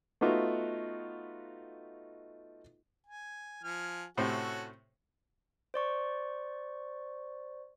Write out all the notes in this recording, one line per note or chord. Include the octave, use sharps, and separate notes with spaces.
A3 B3 D#4 F4 F#4
G#5
F3 G#5 F6
A2 C3 C#4 F#4 A4 C5
C5 D5 C#6